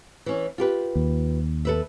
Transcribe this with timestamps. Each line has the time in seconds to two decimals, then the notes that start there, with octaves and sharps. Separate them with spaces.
0.26 E3 C#4
0.58 F4 G4 B4
0.95 D#2
1.65 A4 B4 E5